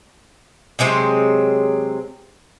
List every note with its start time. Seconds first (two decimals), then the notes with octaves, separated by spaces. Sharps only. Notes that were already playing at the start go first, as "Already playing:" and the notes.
0.79 C3 F#3 G#3 C4